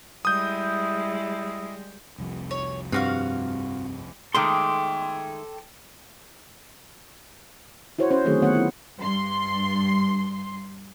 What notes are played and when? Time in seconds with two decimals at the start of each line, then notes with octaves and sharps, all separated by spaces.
0.25 G3 G#3 E4 D#6 G6
2.18 F1 C2 F3
2.51 C#5
2.92 G2 C4 F4 F#4 F5
4.35 D#3 G#3 A3 A4 G5 C6 D6
7.98 E4 F#4 C5 C#5
8.11 C#4 C5 C#5
8.25 D3 D#3 F#3 A3 C4 G#4
8.42 D#3 A3 B3 F4 C#5 F#5
8.55 F#3 E4
8.98 G2 C6